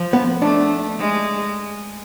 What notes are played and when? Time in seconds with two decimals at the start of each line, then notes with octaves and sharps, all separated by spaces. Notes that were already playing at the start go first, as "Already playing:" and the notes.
Already playing: F3
0.13 B3
0.42 A3 D4
0.99 G#3